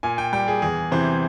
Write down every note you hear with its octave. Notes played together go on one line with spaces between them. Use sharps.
A#2 G#5
G5
G3 G5
G#4
E2 G#4
C3 E3 C5